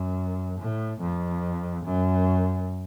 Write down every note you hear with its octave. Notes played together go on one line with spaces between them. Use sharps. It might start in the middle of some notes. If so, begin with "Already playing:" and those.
Already playing: F#2
A2
F2
F#2